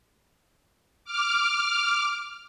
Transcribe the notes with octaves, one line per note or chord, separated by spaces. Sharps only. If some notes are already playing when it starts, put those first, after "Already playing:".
D6 F6